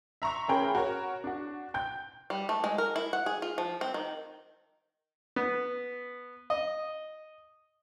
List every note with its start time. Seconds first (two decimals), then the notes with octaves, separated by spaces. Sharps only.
0.22 E5 A#5 C6 C#6
0.48 A1 C#4 G#4 A#4 G5 B5
0.75 F#4 A#4 C#5
1.24 D4 F#4
1.74 G5 G6
2.30 G3
2.49 A3
2.64 G#3
2.78 A#4
2.96 E4
3.13 F#5
3.26 G#4
3.42 F4
3.58 F3
3.81 C4
3.94 D#3
5.36 B3
6.50 D#5